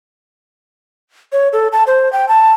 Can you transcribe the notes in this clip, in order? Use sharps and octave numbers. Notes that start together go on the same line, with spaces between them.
C#5
A4
A5
C5
G5
A5